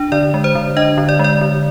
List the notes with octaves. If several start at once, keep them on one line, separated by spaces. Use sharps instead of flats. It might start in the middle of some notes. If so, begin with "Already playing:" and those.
Already playing: D4
D3 D5
G#3
C5
D3
D4 D#5
D3
D5
G#3
D5
D3